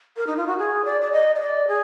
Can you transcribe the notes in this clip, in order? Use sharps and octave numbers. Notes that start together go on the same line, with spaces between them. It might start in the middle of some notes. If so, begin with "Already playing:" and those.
A#4
D#4
F4
F#4
G#4
D5
D5
D#5
D#5
D5
G#4